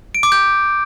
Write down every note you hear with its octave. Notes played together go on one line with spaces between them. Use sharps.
D7
D6
G6